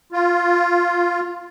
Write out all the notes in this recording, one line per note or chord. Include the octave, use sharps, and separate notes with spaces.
F4